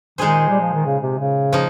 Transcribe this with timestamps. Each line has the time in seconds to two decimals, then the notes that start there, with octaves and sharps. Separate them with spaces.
0.18 A#2 D#3 G#3 D#4 G#4 C5
0.49 G3
0.61 F3
0.73 D#3
0.86 C#3
1.02 C3
1.19 C#3
1.53 F3 A#3 D#4